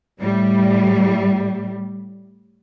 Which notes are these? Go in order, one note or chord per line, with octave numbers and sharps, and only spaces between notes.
A2 G3